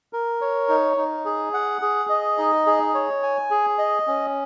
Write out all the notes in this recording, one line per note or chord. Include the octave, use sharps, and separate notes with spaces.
A#4
C#5
D#4
D#4
G#4
F#5
G#4
D#5
D#4
G#4
C#5
G#5
G#4
D#5
C#4